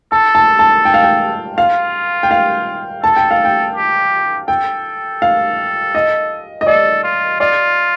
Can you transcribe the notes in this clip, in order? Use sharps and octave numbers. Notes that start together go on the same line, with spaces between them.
A4 A5
A5
A5
G5
F5
G5
F4 F5
G5
F5
A4 A5
G5
F5
G5
G4
A4 G5
F5
D#5
D#5
A4 D5
F4
F4 D5